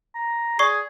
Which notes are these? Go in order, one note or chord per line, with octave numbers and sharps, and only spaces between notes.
A#5
G#4 D5 C#6 C7